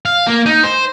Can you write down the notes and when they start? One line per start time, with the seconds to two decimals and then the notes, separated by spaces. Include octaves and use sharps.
0.05 F5
0.27 A#3
0.46 D#4
0.63 C5